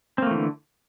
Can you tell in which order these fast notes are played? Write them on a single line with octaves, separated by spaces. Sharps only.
C4 A#3 A3 E3 D3